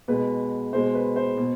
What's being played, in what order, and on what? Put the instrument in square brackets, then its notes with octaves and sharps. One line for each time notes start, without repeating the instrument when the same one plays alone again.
[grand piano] B2 G#3 B4
B2 G#3 C5
B4
C5
B2